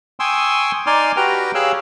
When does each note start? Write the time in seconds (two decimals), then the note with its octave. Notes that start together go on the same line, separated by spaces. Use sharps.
0.20 G5 G#5 C6 C#6 D#6 E6
0.87 D#4 D5 G#5 C6 D6 F6
1.17 F#4 G4 B4 G5 A#5 F6
1.55 G4 G#4 C#5 F5 E6 F#6